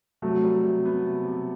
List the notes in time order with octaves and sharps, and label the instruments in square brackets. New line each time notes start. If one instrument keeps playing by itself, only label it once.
[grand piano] C3 [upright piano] F#3 A3
[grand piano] G3
C3
B3
C3
C3